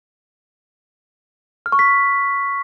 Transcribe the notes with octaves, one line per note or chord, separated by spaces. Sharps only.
F6
C#6
B6